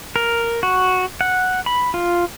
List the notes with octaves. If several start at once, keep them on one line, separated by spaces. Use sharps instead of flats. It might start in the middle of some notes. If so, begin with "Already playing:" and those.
A#4
F#4
F#5
B5
F4